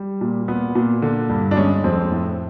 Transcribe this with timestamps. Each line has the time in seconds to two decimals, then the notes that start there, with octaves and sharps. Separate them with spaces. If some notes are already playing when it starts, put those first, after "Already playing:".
Already playing: G3
0.21 A#2
0.48 A#2 B3
0.75 A#2
1.02 D3
1.29 G2
1.51 D4
1.57 G#3 C#4
1.84 F2 C4
2.11 A2